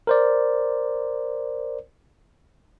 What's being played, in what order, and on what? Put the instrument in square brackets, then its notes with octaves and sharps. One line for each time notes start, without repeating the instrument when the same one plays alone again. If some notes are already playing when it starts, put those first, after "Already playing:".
[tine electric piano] A#4 C5 D5